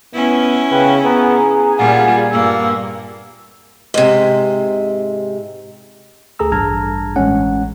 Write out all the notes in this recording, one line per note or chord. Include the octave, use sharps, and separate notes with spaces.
B3 C#4 E4
C#3 B4 G5
B3 G#4 A#5
G#5
A#2 G3 F4 F#5
G2 A#3 E6
G#2 C3
D2 G#4 A4 A#5 E6
A1 G2 A5 A#5 F6 G#6
A1 G#3 C#4 F#5